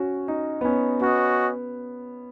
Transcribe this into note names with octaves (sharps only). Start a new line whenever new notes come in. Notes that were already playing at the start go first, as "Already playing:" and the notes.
Already playing: C#4 F#4
D#4
B3
C#4
B3 C#4 F#4 D#5